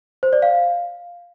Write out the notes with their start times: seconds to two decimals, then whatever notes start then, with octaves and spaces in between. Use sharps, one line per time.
0.23 C5
0.33 D5
0.42 F5